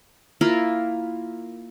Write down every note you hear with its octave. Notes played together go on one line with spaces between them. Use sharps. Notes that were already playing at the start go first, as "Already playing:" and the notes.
A#3 E4 F4 A#4